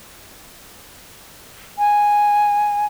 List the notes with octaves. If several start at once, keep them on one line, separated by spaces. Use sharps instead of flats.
G#5